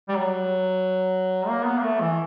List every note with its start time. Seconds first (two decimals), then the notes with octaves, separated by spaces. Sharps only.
0.09 G3
0.15 F#3
1.48 A#3
1.65 B3
1.78 A#3
1.83 A3
2.01 E3